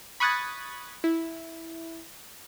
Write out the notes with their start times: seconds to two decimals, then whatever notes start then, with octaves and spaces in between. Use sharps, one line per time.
0.20 B5 C#6 D#6 F#6 G#6 A6
1.04 E4